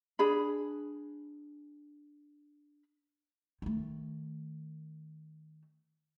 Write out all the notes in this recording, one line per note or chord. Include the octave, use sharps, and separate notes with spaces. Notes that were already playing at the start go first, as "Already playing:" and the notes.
D4 G#4 B5
D#3 A3